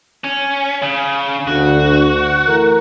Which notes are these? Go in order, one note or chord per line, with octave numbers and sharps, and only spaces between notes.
C#4
C#3
D2 F#4
E3 A3 A#4